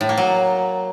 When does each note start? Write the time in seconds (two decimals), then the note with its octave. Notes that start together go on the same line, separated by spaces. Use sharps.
0.01 A2
0.09 A#3
0.17 F#3